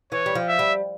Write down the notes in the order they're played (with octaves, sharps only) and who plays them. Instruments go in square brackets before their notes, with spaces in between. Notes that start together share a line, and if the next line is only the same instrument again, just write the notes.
[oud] E3 [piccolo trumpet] C#5
[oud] G3
F3
[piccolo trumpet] E5
[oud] G3